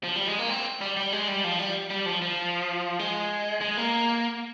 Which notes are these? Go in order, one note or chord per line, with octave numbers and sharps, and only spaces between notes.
F3
G3
G#3
A#3
C4
G3
G3
G#3
G3
F3
G3
G3
F3
F3
G#3
G#3
A#3